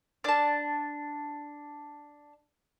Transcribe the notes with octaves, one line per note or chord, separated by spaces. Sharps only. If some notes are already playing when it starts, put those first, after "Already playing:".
D4 A5